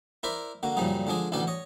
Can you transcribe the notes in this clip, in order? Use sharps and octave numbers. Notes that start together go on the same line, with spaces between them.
E4 A#4 C5 D5 B5
D3 A#3 F#4
F#2 A#2 C#3 F3 G3 D#4
D3 F3 G#3 D4 G#4
A1 D2 B2 D3 D5 A5
C#5 D#5